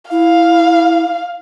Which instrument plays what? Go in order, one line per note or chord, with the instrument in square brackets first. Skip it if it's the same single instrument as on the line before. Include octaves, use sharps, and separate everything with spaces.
[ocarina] E4 [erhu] F5